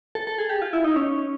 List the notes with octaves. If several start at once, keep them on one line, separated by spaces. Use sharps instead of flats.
A4
A4
G#4
G4
F4
E4
D#4
C#4